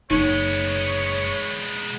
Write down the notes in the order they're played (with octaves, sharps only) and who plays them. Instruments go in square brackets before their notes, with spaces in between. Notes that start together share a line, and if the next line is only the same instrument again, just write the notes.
[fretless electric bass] F#1 [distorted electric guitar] G#3 B3 [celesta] D#4 [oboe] C#5